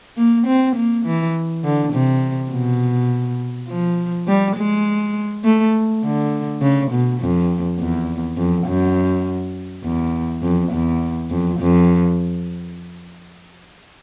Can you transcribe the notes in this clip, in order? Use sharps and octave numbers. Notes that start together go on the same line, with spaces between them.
A#3
C4
A#3
E3
D3
C3
B2
F3
G3
G#3
A3
D3
C#3
B2
F2
E2
F2
F#2
E2
F2
E2
F2
F2